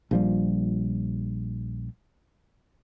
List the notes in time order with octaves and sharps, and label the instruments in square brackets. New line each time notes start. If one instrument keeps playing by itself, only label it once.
[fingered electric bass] A#1 F3 G3